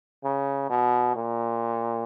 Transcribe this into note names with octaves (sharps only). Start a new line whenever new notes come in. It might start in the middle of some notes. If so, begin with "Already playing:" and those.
C#3
B2
A#2